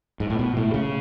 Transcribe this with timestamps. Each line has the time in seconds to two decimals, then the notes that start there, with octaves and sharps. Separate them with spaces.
0.20 G#2
0.30 A2
0.39 B2
0.57 A2
0.74 C#3